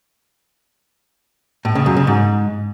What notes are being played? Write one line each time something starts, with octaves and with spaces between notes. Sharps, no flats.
A2
C#3
F#2
C#3
G#2